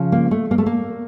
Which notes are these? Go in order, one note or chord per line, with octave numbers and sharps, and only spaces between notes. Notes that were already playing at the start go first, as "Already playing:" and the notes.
Already playing: C#3 F3
A#3
A3
A#3
A3
A#3